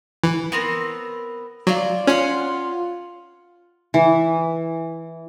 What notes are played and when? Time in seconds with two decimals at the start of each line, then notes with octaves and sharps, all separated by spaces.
0.24 E3
0.52 B3 C4 A#4
1.67 F#3 F4 D5
2.07 C#4 F4 F#5 C6
3.94 E3